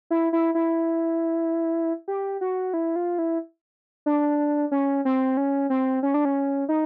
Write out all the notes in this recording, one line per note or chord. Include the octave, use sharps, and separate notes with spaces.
E4
E4
E4
G4
F#4
E4
F4
E4
D4
C#4
C4
C#4
C4
C#4
D4
C#4
D#4